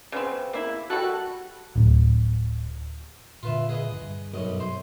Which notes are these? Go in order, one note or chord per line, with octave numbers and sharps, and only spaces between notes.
C#3 B3 C4
A#3 E4
G3 F#4 A4 F#6
D1
A#2 D3 F4 B4 E5
G#4 B4 D#5
G2
B1 F#2 D#5
C5